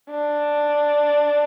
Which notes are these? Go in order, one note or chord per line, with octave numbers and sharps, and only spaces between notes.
D4